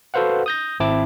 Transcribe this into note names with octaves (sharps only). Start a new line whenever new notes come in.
F#4 A4 B4 C5 F5 F#5
D#6 G6 A#6
G#1 C4 E4 A5 D6